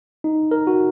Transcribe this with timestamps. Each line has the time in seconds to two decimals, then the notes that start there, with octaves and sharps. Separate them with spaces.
0.24 D#4
0.51 A#4
0.67 F#4